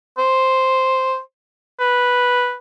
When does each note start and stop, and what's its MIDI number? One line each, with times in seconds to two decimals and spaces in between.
0.18 1.19 72
1.80 2.55 71